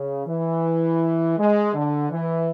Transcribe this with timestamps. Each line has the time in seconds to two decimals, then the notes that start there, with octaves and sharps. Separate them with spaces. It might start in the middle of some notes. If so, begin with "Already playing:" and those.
Already playing: C#3
0.26 E3
1.37 G#3
1.74 D3
2.10 E3